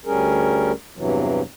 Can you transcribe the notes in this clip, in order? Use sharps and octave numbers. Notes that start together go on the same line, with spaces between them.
D2 G3 C#4 G#4 A#4
E2 G2 C3 E3 F#3